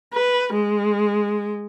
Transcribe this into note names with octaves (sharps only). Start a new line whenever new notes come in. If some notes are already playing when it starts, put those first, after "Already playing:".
B4
G#3